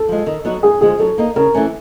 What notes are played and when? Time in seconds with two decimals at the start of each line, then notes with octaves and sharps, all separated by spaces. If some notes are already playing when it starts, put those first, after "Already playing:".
Already playing: A4
0.09 F3 G#3
0.26 D#3
0.45 F#3 B3 D#4 F#4
0.63 G2 G#4
0.81 D3 F3 G#3 G#4
0.99 F#3 A4
1.18 A#3 D#4
1.36 C#3 A#4
1.54 E3 A3 C#4